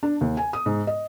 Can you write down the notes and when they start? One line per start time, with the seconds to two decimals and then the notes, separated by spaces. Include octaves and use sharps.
0.03 D4
0.21 D#2
0.37 G#5
0.53 D#6
0.66 G#2
0.87 D#5